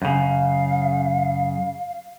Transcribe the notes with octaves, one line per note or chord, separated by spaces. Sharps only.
F#2 C#3 F5